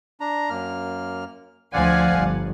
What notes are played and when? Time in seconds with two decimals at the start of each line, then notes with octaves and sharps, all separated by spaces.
0.21 D4 A#5
0.50 F#2 A#3 F6
1.73 D2 F3 D5 F5 F#5 G#5
2.13 G1